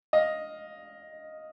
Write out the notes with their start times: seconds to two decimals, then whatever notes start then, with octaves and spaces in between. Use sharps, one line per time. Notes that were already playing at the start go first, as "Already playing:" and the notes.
0.13 D#5 F5